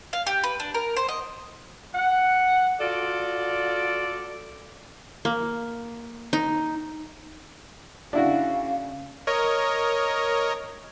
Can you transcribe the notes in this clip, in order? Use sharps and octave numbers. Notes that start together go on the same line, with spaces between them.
F5
G4
B4
D4
A#4
C5
D#5
F#5
F4 F#4 A4 D5
A#3
D#4
C#3 C#4 D4 E4 F#4 F5
A#4 C#5 D#5